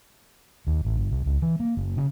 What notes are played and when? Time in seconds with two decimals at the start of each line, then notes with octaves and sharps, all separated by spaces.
0.67 D#2
0.85 A1
0.97 G1
1.11 C2
1.26 C#2
1.42 E3
1.60 A#3
1.77 F#1
1.97 C#3